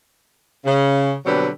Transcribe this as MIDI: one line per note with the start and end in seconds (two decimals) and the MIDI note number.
0.65 1.13 49
1.26 1.48 47
1.26 1.48 50
1.26 1.48 54
1.26 1.48 55
1.26 1.48 60
1.26 1.48 71